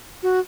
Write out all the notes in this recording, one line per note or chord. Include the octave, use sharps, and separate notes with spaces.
F#4